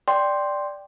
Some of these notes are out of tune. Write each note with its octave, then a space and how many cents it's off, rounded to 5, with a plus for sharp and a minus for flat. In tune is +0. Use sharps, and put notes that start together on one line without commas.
D5 +0 G5 +0 C6 +0